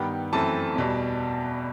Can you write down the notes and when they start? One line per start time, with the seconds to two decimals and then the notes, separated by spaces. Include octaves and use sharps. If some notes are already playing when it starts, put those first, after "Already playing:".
Already playing: G2 D#3 G3 B3 G5
0.33 F#2 E3 A3 C4 A5
0.75 E2 B2 G3